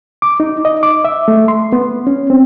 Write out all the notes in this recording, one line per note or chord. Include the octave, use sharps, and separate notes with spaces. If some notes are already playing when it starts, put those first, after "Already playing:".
D6
D#4
D#5
D6
E5
A3
C6
B3
C#4
C4